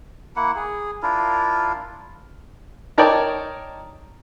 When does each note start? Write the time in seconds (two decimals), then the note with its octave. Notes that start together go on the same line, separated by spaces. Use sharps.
0.36 A#3 E4 F#5
0.56 G#4
1.03 D4 E4 F4 A#4
2.98 D#4 A#4 C#5 D5 G5 A5